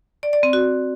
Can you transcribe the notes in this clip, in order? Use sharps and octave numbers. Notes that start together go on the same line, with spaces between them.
D5
D5
C4
F#4